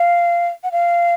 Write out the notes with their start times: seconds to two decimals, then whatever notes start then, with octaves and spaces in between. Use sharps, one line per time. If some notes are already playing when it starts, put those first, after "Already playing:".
Already playing: F5
0.64 F#5
0.72 F5